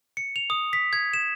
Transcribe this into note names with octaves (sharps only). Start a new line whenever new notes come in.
C#7
F7
D#6
B6
G#6
E7